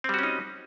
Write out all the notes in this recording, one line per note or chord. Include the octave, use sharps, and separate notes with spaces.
G3 C4 C#4 D#4 F#4